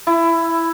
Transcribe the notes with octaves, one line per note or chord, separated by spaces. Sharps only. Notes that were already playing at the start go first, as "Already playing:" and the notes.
E4